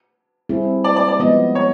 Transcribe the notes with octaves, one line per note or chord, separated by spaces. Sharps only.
G3 C4 E4 G#4
D5
D5
D5
F3 G#3 B3 D#5
C#5